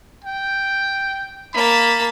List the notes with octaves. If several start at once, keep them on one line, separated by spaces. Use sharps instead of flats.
G5
A#3 A5 B5